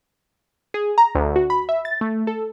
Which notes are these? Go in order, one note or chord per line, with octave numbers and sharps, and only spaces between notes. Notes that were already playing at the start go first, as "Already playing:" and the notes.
G#4
A#5
D2
F#4
B5
E5
A6
A3
A4